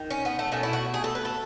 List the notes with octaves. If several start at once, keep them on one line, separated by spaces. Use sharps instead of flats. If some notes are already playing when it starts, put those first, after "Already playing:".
Already playing: D#3
C#4
B3
A3
B2 A3 C#4
E4
F#4
G#4
A4
B4
A4